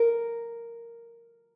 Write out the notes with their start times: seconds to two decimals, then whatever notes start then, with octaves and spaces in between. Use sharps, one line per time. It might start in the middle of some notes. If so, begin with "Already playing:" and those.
Already playing: A#4